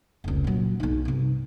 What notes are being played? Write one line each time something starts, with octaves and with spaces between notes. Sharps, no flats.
F1 C#2
A#2 F#3
B1 D#4
G2 C3